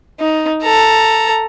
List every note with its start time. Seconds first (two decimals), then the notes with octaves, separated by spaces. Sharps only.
0.20 D#4
0.63 A4 A#5